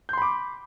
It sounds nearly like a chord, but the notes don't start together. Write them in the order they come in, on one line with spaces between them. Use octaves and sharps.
G6 C6 B5 D6